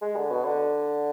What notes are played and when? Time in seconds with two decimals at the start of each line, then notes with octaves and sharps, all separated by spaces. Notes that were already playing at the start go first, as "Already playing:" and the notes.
0.02 G#3
0.16 D3
0.31 B2
0.45 D3